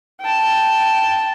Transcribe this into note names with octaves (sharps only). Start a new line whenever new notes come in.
G5 A5